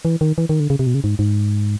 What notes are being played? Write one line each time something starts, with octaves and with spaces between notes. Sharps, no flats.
E3
D#3
E3
D#3
D3
C#3
C3
B2
C#3
G#2
G#2